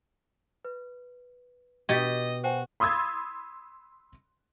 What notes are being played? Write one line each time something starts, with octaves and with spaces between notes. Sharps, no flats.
B4
B2 G4 D#5 G#6 A6 B6
F#4 C5 G5 G#5
B5 C6 D#6 E6 G#6 A6